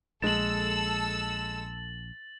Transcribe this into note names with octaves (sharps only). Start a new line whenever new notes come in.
A#1 G#3 A4 E6 A6 E7 F#7